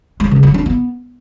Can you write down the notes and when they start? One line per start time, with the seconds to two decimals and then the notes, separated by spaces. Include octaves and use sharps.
0.20 G#3
0.31 C#3
0.43 F#3
0.54 D4
0.66 B3